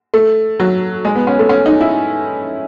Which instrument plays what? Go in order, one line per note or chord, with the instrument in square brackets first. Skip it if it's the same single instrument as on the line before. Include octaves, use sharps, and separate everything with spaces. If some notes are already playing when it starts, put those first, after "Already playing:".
[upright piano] A3
F#3
G#3
B3
C#4
A3
C#4
D#4
E4